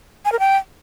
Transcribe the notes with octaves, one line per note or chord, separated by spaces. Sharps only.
G#5
A#4
G5